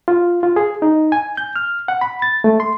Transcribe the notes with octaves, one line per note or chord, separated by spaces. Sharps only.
F4
F4
G#4
D#4
G#5
G6
F6
F#5
B5
A6
A3
C6